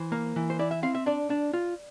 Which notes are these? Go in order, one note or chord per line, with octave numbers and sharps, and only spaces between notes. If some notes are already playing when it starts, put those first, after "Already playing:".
Already playing: E3 C5
A#3
E3
C5
E4 D5
E5
C4 F5
E5
D4 D5
D4
F4